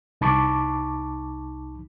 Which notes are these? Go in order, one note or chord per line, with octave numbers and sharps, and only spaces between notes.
C2 D#4 A5 B5 C#6 D6